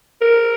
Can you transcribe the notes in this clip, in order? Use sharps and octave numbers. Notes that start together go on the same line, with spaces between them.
A#4